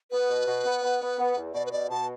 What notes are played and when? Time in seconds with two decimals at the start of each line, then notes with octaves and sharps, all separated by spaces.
0.11 B3 B4
0.29 B2
0.46 B2
0.65 B3
0.82 B3
1.00 B3
1.18 B3
1.36 E2
1.54 B2 D5
1.66 B4
1.72 B2 D5
1.90 B2 A5